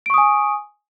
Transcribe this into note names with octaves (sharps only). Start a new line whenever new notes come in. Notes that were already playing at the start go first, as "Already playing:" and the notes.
G#5 C#6 D#6 D7